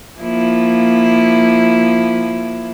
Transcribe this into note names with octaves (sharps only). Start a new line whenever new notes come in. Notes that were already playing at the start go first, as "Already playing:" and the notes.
F3 A#3 E4